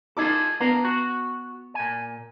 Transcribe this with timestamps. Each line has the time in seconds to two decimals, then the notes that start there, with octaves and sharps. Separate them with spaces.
0.17 D#4 F4 G#4 A4 D6
0.60 B3 D4 F5 A#5
0.85 F#4
1.75 A#2 G#5